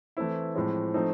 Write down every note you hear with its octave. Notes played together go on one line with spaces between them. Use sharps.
E3 A3 C4 E4
A2 F3 G#3 C4
F3 A3 C4 D#4